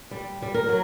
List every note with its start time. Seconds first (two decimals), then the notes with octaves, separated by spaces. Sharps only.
0.11 G3
0.42 G3
0.54 A#4
0.69 F#3